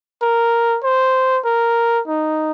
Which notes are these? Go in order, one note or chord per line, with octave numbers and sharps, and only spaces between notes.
A#4
C5
A#4
D#4